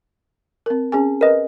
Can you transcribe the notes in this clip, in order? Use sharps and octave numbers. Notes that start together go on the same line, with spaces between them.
C4 A#4
C#4 G#4 G#5
A#4 B4 D#5